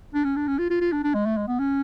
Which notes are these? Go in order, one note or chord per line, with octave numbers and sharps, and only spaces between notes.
D4
C#4
D4
C#4
F4
F4
F4
D4
D4
G#3
A3
G#3
B3
C#4